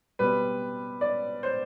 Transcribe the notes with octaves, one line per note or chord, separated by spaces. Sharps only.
B2 G3 C4 B4
D5
C5